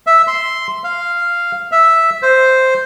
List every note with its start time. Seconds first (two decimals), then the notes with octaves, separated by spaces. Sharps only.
0.07 E5
0.27 C6
0.84 F5
1.72 E5
2.23 C5